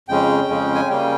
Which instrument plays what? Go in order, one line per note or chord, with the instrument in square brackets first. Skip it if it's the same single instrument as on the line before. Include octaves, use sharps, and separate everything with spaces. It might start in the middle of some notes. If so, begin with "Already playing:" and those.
[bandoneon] F2 C#3 G#3 C#4 G5
F2 C#3 G#3 C#4
G#5
C#3 G3 A#3 C#4 G5